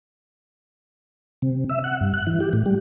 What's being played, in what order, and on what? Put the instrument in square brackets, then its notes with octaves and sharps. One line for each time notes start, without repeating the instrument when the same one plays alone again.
[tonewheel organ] C3
E5
F#5
G2
F#6
E3
G4
A2
G3